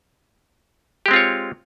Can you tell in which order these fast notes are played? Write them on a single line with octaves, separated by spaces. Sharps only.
G4 G#3 C4 F4 C#5